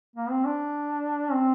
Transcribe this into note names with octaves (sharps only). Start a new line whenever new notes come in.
A#3
C4
D4
C4